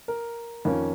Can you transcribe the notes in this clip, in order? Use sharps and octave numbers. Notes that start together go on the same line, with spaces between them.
A#4
F2 D#3 A#3 C#4